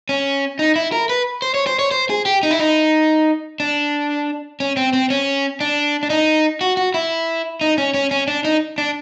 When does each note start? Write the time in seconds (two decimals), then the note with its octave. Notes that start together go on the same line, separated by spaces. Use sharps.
0.09 C#4
0.59 D#4
0.76 E4
0.92 A#4
1.10 B4
1.42 C5
1.54 C#5
1.67 C5
1.79 C#5
1.91 C5
2.10 G#4
2.26 G4
2.43 D#4
2.51 E4
2.59 D#4
3.60 D4
4.60 C#4
4.77 C4
4.93 C4
5.10 C#4
5.61 D4
6.03 D4
6.10 D#4
6.61 F#4
6.77 F#4
6.94 E4
7.61 D#4
7.78 C#4
7.94 C#4
8.11 C#4
8.28 D4
8.45 D#4
8.78 D4